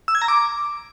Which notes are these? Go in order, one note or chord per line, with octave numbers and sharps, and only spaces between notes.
E6
G#6
A#5
D6